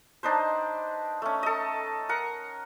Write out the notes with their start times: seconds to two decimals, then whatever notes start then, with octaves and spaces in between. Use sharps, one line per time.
0.23 D4 D#4 B4 C5
1.22 A3 C#4
1.43 A4 D#5
2.09 A#4 F#5